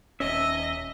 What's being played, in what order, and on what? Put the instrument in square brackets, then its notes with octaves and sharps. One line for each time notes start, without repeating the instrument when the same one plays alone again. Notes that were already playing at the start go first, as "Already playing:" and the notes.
[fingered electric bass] D#1 C#4 [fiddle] D#5 [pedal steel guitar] E5